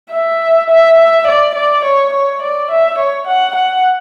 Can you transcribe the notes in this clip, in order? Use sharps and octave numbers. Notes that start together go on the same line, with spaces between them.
E5
E5
E5
D5
D5
C#5
C#5
D5
E5
C#5
F#5
F#5